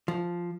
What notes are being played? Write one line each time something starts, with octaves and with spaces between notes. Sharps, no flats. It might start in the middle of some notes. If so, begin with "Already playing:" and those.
F3